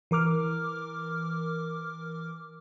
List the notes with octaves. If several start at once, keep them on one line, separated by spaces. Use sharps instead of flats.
E3 A#4 D6 F6